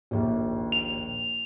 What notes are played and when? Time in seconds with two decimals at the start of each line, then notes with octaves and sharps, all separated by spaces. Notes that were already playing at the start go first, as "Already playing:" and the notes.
0.11 A#1 D#2
0.72 F7